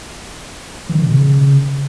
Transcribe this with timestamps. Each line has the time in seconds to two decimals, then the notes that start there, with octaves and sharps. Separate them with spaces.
0.89 E3
0.95 D#3
1.01 D3
1.06 B2
1.12 C#3